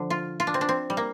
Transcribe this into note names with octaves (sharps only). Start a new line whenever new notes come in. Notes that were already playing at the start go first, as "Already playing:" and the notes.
Already playing: D3 F3
F4
F4
D4
C4
D4
C4
G3
A#3